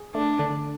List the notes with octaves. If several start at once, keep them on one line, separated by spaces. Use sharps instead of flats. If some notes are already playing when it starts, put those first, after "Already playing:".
Already playing: G#4
A3 D4
D3